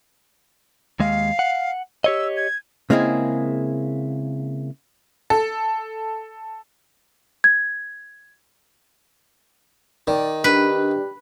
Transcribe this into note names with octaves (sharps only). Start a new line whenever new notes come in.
D#2 G#3 F5
F#5
G4 C#5 D#5 E6
G#6
C#3 G#3 A#3 C4 E4 G#4
A4
G#6
D#3 D5
D4 G4 B4